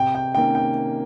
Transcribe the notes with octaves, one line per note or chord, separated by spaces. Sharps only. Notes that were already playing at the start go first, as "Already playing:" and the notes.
Already playing: C3 G5
G5
D#3 A#3 C#4 G5
G5